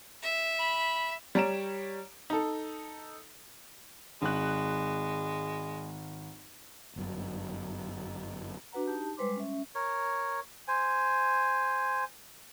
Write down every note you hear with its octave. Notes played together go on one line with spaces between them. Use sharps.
E5
B5
G3 C#5 A#5 D7 E7
D#4 A4
G#1 G#3 F#6
G1 F#2
D4 F#4 B4 F#5 A#5
D#4 G4 A5
G3 G#3 B4 C5 C6 D6
C#4 E5
A#4 C#5
C5 G#5